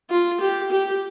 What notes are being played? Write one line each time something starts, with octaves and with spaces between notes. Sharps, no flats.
F4
G4
G4